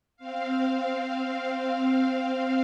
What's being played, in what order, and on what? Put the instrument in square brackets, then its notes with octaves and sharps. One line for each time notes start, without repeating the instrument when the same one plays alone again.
[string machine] C4 F5